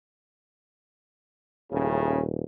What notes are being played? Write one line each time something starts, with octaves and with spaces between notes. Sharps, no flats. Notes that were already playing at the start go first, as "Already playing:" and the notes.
D#1 A2 C#3